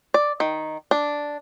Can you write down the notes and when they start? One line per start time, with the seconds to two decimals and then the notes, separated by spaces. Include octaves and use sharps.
0.14 D5
0.40 D#3
0.91 D4